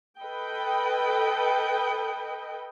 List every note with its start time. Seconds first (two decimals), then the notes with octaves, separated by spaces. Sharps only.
0.20 A4 B4 D#5 G5